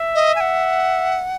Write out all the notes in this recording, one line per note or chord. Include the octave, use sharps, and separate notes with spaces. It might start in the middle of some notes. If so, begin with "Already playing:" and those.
Already playing: E5
D#5
G#5
F#5